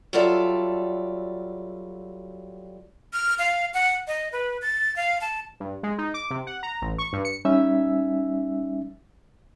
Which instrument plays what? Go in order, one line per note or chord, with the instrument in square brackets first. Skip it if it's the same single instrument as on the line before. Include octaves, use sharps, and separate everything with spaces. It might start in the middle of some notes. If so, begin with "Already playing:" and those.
[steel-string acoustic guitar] F#3 G3 F4 A4 D5 E5
[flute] F6
F5
F#5
D#5
B4
A6
F5
A5
[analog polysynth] G2
G#3
D#4
D6
C3
F#5
A#5
A1
C#6
G2
C#7
[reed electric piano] G3 C#4 D#4 E5 E6